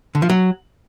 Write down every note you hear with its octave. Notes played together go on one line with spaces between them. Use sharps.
D3
F3
F#3